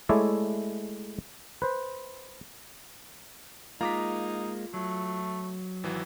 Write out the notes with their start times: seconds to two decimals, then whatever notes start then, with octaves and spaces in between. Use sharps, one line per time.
0.09 G#3 A3 E4 C#5 D5 E5
1.62 B4 C5
3.81 G#3 A#3 D#4 F4 A#5 D6 B6
4.74 F#3 A3
5.84 G#1 E3 F#3